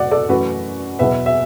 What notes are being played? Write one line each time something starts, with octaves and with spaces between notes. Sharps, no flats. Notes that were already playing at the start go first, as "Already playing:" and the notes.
Already playing: E2 B2 F#3 A3 D5 F#5
A4 D5
F#2 E3 A3 F#4 B4
E2 B2 F#3 B3 B4 E5
E5